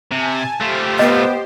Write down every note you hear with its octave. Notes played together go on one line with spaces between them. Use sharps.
C3 G#5 A5
A3 F4 G4 C5
B3 D#5